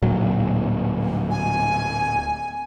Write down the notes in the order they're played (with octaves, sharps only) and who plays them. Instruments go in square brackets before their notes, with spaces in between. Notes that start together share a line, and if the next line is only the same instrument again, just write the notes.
[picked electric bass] D1 A#2 F#3
[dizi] G#5